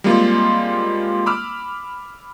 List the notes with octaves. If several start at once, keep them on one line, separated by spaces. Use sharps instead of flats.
G3 G#3 A#3 C4 F4
B5 D6 E6 F6